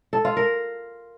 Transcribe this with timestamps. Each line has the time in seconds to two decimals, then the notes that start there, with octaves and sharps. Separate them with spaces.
0.13 A4
0.25 F4
0.37 A#4